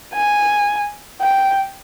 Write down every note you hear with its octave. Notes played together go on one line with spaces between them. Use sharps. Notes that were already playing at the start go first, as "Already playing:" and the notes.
G#5
G5